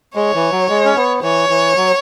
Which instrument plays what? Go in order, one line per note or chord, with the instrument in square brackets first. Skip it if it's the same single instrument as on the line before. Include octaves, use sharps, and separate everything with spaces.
[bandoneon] G#3 [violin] C#5
[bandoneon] E3
F#3
G#3
C#4
B3
[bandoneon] E3 [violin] C#5
[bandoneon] E3
F#3